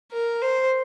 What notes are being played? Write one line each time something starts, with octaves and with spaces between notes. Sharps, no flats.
A#4
C5